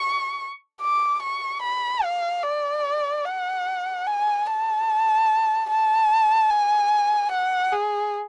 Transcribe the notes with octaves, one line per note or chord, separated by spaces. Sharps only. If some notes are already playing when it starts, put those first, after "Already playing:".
Already playing: C#6
D6
C#6
B5
F5
D5
F#5
G#5
A5
A5
G#5
F#5
G#4